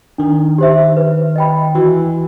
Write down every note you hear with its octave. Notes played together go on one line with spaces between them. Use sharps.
D#3 D4
G4 C5 E5
B4
D#5 G5 B5
E3 F#4